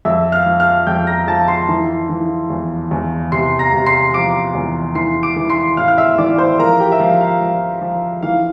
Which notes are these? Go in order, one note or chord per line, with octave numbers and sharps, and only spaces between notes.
F2 E5 E6
F5 F6
F3
F5 F6
F2 G5 G6
A#5 A#6
F3 A5 A6
C6 C7
E3
E3
E2
E2
C3 C6 C7
A#5 A#6
C3
C6 C7
F3 D6 D7
E2
E3 C6 C7
D6 D7
E3
C6 C7
A2 F5 F6
F6
E5 E6
E3 D5 D6
C5 C6
F3 A#4 A#5
G4 G5
E5
F3 F5
F5
F3
F3
E3 F5